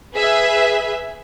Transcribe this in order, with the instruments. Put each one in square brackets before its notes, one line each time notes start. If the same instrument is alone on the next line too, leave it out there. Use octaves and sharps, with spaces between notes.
[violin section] G#4 B4 E5